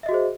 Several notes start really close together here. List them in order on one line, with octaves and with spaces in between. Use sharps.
E5 D#5 F#4 G#4 C5